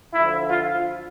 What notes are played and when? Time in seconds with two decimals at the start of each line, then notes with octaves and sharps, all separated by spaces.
0.14 D2 D3 F3 E4
0.49 F4